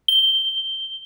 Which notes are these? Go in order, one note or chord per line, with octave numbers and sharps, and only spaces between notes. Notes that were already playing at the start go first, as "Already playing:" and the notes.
G7